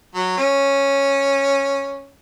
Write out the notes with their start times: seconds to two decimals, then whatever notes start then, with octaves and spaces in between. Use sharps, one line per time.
0.14 F#3
0.37 C#4